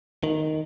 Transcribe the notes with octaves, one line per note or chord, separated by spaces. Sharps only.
D#3